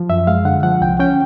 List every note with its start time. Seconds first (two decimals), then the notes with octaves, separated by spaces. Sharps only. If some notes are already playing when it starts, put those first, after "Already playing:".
Already playing: F3
0.09 F#2 E5
0.27 G#3 F5
0.45 D3 F#5
0.63 F3 F#5
0.81 C2 G5
0.99 C#4 G5